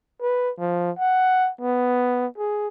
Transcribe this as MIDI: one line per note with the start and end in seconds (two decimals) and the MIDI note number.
0.21 0.51 71
0.59 0.91 53
0.99 1.50 78
1.61 2.26 59
2.38 2.68 68